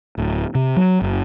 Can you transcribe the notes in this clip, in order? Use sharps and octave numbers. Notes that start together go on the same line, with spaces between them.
D1
C3
F#3
F#1